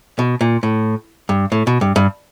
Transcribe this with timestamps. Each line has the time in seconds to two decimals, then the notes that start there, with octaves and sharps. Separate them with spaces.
0.19 B2
0.41 A#2
0.63 A2
1.29 G2
1.52 A2
1.67 B2
1.81 G2
1.96 G2